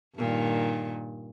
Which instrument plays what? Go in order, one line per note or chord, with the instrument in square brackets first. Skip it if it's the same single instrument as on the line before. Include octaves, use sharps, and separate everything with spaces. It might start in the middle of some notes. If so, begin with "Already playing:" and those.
[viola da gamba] G2 A#2 D#3